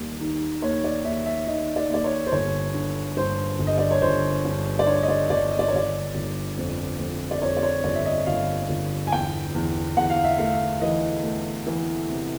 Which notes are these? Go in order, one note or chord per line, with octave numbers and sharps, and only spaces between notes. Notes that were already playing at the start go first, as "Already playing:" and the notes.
Already playing: D#2 G3
D#3
D#2 C#5
D5
D#2 E5
E5
D#3 D#5
D5
D#2 D5
C#5
C5
G1 C#5
D3
G2 C5
G1
D#5
D5
C#5
G1 C5
G2
D5
D3 C#5
D#5
D5
G1 D5
D#5
D5
C#5
G1 D5
G1
F2
F2
D5
F2 C#5
D5
C#5
G1 D5
E5
D#5
G1 F5
G1
G#5
E2 G5
E2
E2 F#5
F5
E5
A3 F5
E3 D#5
A3
E3
C3